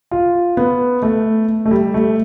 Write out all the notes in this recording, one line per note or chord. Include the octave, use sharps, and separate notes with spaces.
F4
B3
A3
A3
G3
A3